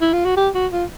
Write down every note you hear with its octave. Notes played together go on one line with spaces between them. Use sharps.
E4
F4
F#4
G4
F#4
F4